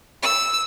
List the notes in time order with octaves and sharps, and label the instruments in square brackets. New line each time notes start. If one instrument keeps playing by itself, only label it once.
[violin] E6